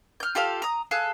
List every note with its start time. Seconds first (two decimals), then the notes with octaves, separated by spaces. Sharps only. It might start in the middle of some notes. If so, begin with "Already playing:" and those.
0.20 F6 G6
0.35 F4 G4 A4 F5
0.62 A#5 D#6
0.91 G#4 A4 F5 F#6